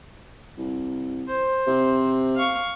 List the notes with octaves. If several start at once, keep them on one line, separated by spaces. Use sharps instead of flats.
C2
C5
C3
F5 C#6